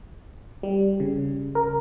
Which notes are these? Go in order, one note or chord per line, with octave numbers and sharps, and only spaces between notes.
G3
C#3
A#4